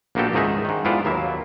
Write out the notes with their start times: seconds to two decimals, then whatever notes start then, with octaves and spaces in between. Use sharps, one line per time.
0.15 A#1 A#3 B3 F#4 G4 A4
0.33 C#2 G#2 D#3 D#4 G#4 E5
0.65 G#2 D#3
0.85 F2 G#2 B3 E4 F4 D5
1.05 D#2 F#3 A#3 B3 E5